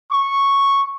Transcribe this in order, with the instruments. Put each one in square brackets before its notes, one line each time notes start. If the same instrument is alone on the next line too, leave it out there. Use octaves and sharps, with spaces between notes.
[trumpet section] C#6